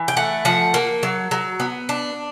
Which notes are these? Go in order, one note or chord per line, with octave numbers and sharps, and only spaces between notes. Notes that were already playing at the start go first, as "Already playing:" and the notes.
Already playing: E3
G5
A3 F#5
F3 F#5
A#3
F#3
F#3
B3
D4